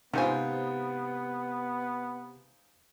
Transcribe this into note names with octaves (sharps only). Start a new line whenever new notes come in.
G#2 C3 B3 C#4 F4 C5 G#5